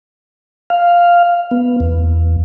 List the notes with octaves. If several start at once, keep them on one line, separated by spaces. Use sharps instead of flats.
F5
B3
E2